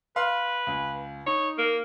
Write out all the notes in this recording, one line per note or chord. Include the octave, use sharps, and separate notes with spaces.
B4 F5 C6
C#2
D#4 C#5
A#3